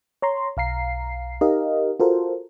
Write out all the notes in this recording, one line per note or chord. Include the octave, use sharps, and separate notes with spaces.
C#5 A#5 C6
B1 F5 A#5 C7
D#4 G4 A#4 D#5 F5
F4 F#4 A4 A#4 C5